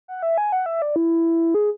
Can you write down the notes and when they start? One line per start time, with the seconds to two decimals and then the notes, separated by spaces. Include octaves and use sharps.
0.08 F#5
0.23 E5
0.38 G#5
0.52 F#5
0.66 E5
0.82 D5
0.96 E4
1.54 G#4